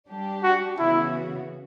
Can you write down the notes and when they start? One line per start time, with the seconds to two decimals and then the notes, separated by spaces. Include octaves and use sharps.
0.09 G3 D4 G4
0.44 F#4
0.78 C#3 E3 B3 E4 F#4